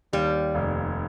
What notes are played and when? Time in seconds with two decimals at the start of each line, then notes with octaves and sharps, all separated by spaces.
0.13 D#2 G3
0.55 F1